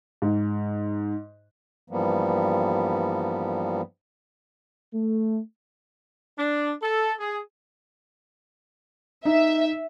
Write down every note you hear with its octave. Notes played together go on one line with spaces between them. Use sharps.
G#2
G2 E3 F3 G3 A#3 B3
A3
D4
A4
G#4
D#4 E5